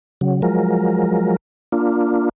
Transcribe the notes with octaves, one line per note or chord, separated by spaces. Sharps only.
C#3 F#3
F3 F#3 G#3 A#4
A#3 D4 F4